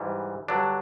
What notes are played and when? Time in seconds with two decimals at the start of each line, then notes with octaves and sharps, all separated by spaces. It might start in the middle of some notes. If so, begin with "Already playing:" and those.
Already playing: G#2 E3 G3
0.48 G2 D3 F#3 D4